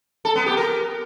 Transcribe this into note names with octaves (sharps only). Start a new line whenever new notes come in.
A4
B3
G4
A#4